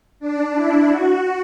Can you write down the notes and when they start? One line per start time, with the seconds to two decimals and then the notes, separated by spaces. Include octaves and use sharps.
0.20 D4
0.54 E4
0.88 F#4